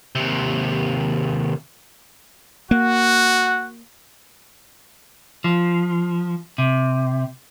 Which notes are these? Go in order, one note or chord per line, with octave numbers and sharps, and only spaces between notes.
D#2 C3
A#3 F#4 F#5
F3
C3